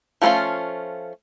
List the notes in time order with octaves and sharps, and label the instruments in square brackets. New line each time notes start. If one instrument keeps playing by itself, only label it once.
[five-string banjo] F3 A3 C4 C#4 F4